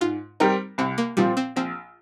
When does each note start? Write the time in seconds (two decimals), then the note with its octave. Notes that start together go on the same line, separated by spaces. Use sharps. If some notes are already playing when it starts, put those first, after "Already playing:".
0.01 G#2 F4
0.40 G3 C4 D#4 G4 A#4
0.78 C2 C4
0.98 A#3
1.17 A#2 F3 G3 C4
1.37 C4
1.56 A#1 C4